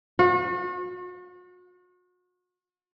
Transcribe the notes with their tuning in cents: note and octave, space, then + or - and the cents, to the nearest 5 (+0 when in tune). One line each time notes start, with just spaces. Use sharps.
F#4 -40